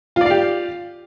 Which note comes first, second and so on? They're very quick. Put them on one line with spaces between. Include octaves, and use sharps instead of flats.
F4 D5 F5 G4